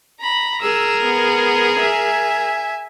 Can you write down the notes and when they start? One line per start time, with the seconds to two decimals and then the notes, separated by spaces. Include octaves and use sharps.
0.21 A#5 B5
0.62 G#4 A#4 E6
1.03 B3
1.79 E5 G#5